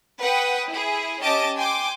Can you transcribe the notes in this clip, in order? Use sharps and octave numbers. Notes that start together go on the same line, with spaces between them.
B4 F#5 G5 D#6
E4 G#4
C#4 G4 D#5 A5 D6
G5 G#5 C6 D6